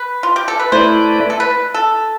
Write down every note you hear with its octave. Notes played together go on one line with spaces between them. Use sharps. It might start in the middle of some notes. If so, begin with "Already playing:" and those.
Already playing: B4
F4
G4
A4
B4
A3 E4 B4 C5 D5
A4
B4
A4